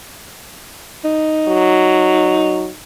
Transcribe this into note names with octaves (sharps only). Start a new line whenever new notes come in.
D#4
F#3